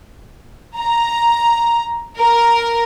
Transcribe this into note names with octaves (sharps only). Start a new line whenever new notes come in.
A#5
A#4